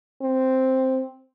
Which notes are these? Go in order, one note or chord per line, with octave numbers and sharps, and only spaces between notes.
C4